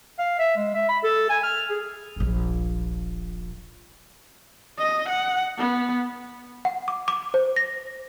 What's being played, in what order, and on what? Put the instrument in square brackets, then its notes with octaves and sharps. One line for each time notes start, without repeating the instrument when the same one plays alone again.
[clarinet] F5
E5
G#3
E5
B5
A4
G#5
F6
G#4
[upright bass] D#1 A#1
[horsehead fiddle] D#5
F#5
B3
[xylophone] F#5
D6
D6
C5
A#6